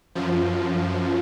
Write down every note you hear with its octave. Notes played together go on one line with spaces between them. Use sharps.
F#2 F3